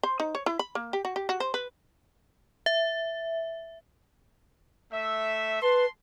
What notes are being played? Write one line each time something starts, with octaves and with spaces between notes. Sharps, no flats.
C5
D#4
C#5
E4
B5
A#3
G4
F#4
G4
F#4
C5
B4
E5
A3 E5
B4 A5 C6